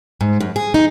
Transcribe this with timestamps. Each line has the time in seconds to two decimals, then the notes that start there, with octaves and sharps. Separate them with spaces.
0.21 G#2
0.41 F#2
0.56 G#4
0.74 D#4